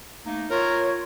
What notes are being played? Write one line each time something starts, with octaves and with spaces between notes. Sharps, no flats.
A3 A#3 D#4
F4 A#4 C#5